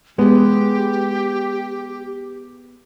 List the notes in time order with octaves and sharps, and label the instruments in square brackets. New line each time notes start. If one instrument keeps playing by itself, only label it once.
[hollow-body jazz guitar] G#3 B3 [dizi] G4